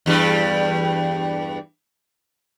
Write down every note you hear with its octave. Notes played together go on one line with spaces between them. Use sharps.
E2 G2 G3